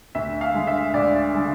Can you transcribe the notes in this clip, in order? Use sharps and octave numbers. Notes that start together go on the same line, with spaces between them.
D2 E5
F5
D3 G#3
E5
D2 D5
D3 G#3